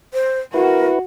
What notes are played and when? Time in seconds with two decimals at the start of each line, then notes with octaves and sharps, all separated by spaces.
0.14 C5
0.54 E4 F#4 A#4 B4